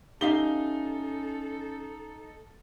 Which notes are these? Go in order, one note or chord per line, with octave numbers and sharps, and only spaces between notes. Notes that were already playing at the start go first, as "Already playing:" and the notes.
C#4 D#4 G4 A4 E5 F5 G7